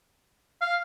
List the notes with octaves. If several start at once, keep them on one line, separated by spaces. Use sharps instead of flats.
F5